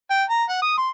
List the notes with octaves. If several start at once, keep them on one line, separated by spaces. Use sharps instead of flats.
G5
A#5
F#5
D#6
C6